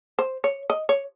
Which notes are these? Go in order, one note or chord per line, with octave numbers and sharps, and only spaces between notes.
C5
C#5
D#5
C#5